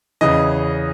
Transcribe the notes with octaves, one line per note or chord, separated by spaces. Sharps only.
E2 C#3 E3 D#5